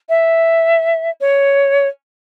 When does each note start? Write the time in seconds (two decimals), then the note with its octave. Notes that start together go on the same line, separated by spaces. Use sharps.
0.09 E5
1.20 C#5